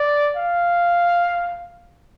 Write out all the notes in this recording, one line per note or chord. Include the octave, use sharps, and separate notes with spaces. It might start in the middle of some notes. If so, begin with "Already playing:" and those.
Already playing: D5
F5